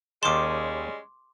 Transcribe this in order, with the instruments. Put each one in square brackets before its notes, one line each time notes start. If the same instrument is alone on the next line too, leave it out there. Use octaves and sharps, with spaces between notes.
[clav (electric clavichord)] D#2 D#3 A5 [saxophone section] G3 G#3 C#4 [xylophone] C6 D6